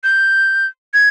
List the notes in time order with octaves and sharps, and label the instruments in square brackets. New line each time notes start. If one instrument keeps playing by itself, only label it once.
[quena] G6
G#6